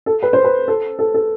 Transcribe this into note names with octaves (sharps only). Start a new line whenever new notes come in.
A4
B4
C5
B4
A4
A4
A4